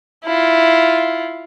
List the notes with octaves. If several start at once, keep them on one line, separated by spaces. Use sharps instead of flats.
E4 F4